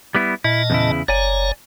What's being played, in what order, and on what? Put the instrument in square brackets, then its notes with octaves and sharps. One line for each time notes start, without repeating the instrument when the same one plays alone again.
[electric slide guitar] G3 B3 E4
[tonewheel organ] A#2 D#5 A5 [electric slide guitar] E4
[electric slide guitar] E2 C#3 E4
[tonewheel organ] F#1 C#5 A#5 [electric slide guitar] D5 G#5